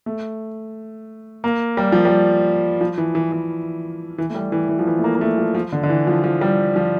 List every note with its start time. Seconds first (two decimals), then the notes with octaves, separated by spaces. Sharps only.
0.06 A3
1.44 A#3
1.77 G3
1.92 F3
2.05 G3
2.81 F3
2.98 E3
3.15 E3
3.32 E3
4.18 E3
4.30 A3
4.35 G3
4.52 E3
4.69 E3
4.79 F3
4.87 E3
4.99 A3
5.04 A#3
5.15 A#3
5.21 A3
5.38 F3
5.55 F3
5.72 D3
5.83 D3
5.89 E3
6.07 F3
6.24 F3
6.41 G3
6.76 F3